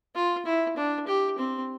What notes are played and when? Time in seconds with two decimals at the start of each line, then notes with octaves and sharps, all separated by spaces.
0.15 F4
0.46 E4
0.77 D4
1.07 G4
1.38 C4